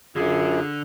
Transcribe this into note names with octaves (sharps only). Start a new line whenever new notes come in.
F#2 D3 F4 G#4